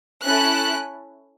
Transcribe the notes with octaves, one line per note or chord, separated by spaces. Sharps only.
C#4 E4 A4 F#6